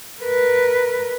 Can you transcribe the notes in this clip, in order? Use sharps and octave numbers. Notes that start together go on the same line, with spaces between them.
A#4 B4